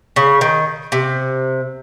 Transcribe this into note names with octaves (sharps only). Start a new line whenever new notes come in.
C#3
D#3
C3